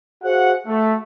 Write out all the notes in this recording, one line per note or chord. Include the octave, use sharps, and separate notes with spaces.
F#4 G#4 C5 F5 F#5
A3